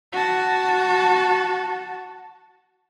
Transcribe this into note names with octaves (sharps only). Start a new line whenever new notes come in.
F#4 A5